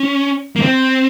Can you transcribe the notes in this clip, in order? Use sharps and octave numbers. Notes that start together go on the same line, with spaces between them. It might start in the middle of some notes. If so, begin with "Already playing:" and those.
Already playing: C#4
A#3
C4